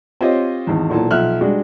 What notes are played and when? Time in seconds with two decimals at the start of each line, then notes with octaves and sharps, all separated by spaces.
0.21 C4 F4 G4 C5 C#5 D#5
0.67 G#1 E2
0.90 B1 A#2 E3 A5
1.11 B1 F3 E5 F6 F#6
1.41 G3 G#3 D4 F#4